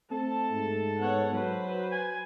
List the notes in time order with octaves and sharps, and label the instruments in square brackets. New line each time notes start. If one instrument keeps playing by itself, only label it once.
[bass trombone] A3 [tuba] C4 [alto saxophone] A4 [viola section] A5
[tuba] G#2
[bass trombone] B3 [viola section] C#5 F#5
[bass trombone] F#3 [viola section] B4 C5
[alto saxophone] G#5